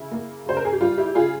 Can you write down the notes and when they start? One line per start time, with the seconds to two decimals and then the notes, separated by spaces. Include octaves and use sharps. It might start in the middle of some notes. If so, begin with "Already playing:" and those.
Already playing: C#3 E4
0.12 A#3
0.46 C#3 C5
0.57 A#4
0.65 G#4
0.73 G4
0.80 G3 F4
0.98 E4 G4
1.15 C#3 F4 G#4